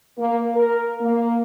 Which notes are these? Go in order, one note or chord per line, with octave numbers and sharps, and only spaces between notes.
A#3
A#4
A#3